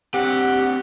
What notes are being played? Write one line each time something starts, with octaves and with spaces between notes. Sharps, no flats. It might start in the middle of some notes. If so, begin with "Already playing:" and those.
C4 D4 G4 F#5